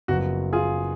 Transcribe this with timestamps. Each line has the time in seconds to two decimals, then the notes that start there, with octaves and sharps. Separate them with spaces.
0.08 F#1 F#2 F3 B3 F#4
0.53 F4 G#4